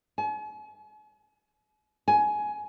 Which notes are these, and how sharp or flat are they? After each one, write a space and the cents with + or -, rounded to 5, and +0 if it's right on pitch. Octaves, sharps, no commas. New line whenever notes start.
G#5 +45
G#5 +15